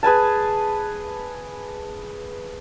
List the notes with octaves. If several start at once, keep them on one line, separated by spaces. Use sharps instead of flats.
G#4 B4 G#5 A5